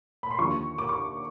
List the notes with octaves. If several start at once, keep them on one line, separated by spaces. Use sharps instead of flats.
B5
C6
D#2 D3 F3 C#6
D6
C#6